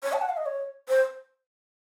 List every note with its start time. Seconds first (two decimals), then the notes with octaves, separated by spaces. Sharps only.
0.03 C#5
0.13 A5
0.21 F#5
0.29 F5
0.37 D#5
0.46 C#5
0.88 C5